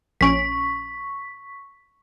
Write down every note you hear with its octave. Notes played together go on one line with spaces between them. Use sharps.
A#1 C#4 C#6 B6 D7